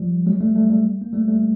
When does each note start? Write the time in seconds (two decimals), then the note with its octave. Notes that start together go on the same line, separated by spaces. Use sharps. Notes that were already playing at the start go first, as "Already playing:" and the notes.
Already playing: F3 G3
0.26 F#3 G#3
0.41 G3 A3
0.56 G3 A3
0.70 G3 A3
1.01 A#3
1.13 G3 A3
1.28 G3 A3